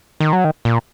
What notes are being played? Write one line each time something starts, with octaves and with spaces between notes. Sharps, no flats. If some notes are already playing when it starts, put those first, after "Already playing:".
D#3
F#3
D#3
A#2